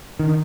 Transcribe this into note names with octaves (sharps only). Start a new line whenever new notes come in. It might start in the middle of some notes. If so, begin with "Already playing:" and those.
D3 D#3